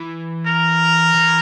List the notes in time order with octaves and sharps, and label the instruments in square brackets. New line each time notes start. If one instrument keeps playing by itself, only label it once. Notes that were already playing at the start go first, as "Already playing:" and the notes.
Already playing: [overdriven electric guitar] E3
[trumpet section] A#4
[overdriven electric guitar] E3